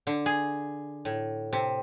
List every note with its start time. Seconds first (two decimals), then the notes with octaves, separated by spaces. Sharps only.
0.07 D3
0.26 G#4
1.05 A2
1.53 C3